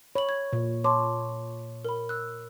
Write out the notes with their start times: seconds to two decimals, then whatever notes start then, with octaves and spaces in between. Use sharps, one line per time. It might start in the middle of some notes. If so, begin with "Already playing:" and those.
0.15 C#5 B5 F#7
0.29 G#6
0.53 A#2
0.84 C#5 A5 C6 D6
1.85 A#4 B5
2.09 E6 F#6